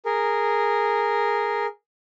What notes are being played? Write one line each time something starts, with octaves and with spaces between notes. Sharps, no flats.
G#4 A#4